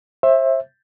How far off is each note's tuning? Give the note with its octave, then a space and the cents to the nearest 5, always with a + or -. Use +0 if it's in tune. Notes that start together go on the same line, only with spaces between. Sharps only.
C5 +35 E5 +0